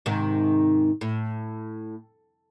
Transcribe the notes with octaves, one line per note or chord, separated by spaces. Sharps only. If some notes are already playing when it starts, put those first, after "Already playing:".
G#2 C3 D#3
A2